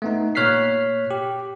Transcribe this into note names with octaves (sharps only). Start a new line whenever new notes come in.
A3 B3 D#4
A#2 C#5 F6 F#6 B6 C7
G4